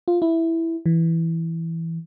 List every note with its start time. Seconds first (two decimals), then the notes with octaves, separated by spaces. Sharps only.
0.08 F4
0.22 E4
0.86 E3